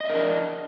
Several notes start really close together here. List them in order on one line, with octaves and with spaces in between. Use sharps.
D#5 E5 A#4 D4